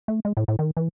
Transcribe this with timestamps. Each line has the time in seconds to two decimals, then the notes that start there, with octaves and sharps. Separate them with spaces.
0.08 A3
0.25 G#3
0.37 A2
0.48 A2
0.59 D#3
0.77 E3